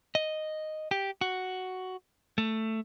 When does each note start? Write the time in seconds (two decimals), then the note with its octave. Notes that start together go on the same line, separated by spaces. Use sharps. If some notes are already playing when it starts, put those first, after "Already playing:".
0.15 D#5
0.91 G4
1.21 F#4
2.38 A3